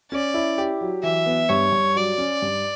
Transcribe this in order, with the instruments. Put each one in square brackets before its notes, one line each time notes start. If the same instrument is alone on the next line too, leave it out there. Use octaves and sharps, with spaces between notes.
[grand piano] C#4 [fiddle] D5
[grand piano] E4
G4
F#3
[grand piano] E3 [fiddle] E5
[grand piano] B3
[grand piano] G2 [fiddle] C#5
[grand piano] G2
[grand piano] F#3 [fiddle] D5
[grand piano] C#4
G2